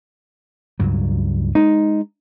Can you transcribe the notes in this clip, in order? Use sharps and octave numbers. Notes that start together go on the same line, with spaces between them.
C#2 G2 F#3
G#3 D#4